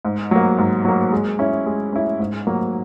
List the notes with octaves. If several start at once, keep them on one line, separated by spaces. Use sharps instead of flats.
G#2
F#3 A#3
G#2
F#3 A#3
G#3
C#4 E4
G#3
C#4 E4
G#2
F#3 A#3